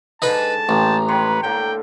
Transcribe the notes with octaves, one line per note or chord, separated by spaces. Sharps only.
G#2 D3 D#4 B4 A5 B5
A1 G#3 A#3 G5 A#5
D#3 B4 C#5 C6
A2 D3 A#3 G5